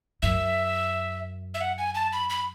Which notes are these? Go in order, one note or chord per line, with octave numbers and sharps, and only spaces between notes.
F#2 E5
E5
F#5
G#5
A5
B5
B5